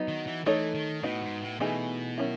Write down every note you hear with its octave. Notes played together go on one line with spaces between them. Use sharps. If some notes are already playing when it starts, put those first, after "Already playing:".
Already playing: F#3 B3 D#4
D#3
E3
E3 A3 D#4 A4 C#5
D#3
A2 B3 D#4 F#4
G#2
A2
B2 E3 A3 D#4 G#4
D#3 F#3 C#4 E4